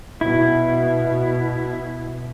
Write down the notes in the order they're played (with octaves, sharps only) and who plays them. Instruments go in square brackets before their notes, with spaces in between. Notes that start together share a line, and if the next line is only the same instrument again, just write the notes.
[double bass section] B2 [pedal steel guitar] E4